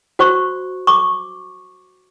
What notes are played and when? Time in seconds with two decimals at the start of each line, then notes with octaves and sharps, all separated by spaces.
0.19 F#4 C5 C#6
0.87 C#6 D6